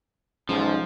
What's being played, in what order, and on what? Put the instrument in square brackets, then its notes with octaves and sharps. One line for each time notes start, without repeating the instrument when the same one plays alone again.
[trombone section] B1 E2 G#2 [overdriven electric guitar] F3 [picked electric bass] C#4